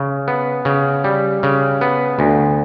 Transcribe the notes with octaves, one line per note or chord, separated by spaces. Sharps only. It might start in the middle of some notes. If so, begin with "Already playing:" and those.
Already playing: C#3
B3
C#3
G3
C#3
B3
D2